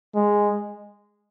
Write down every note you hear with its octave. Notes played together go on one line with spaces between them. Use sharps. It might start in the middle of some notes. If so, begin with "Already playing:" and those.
G#3